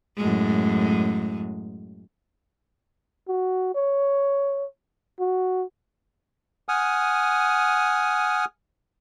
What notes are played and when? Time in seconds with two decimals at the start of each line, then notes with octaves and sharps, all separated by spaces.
0.17 F#2 A2 G#3
3.29 F#4
3.75 C#5
5.20 F#4
6.69 F#5 G#5 D#6 F6